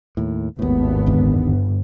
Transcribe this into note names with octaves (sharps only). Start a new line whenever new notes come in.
D#2 A2
G#1 D#2 A2 B3
F#1 D#2 D3
G1